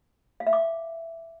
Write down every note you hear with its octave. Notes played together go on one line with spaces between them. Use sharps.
F5
E5
D6